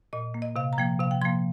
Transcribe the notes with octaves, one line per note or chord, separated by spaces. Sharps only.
A#2 D#5
A#3
D#5
C3 F5
A#5
F3 A#3 G5
C3 F5
G5
F3 A#3 C6